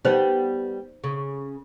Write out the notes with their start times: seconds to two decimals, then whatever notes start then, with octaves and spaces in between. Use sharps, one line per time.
0.05 G3 B3 D#4 C5
1.04 C#3